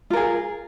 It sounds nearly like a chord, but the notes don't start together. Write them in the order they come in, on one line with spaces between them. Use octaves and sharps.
F4 A#4 G#4